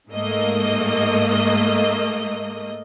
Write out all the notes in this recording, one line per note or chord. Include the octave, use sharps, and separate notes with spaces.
G#2 A3 A#3 D#5